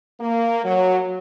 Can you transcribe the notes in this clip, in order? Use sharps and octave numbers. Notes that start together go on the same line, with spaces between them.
A#3
F#3